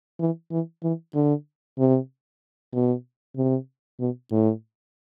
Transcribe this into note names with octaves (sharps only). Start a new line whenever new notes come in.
E3
E3
E3
D3
C3
B2
C3
B2
A2